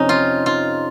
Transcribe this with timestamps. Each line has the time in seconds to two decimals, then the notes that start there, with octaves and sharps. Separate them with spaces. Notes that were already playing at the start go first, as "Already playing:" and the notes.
Already playing: F2 C3 C#4 D#4
0.09 F4
0.46 F4